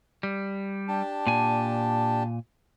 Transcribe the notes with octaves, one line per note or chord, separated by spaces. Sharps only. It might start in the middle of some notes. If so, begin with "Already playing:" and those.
G3
D4 G4 A5
A#2 G#5